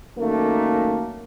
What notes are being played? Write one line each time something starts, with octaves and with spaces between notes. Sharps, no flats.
F#2 D#3 A3 A#3